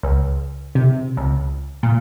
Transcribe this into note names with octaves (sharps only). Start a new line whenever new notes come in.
C#2
C3
C#2
A#2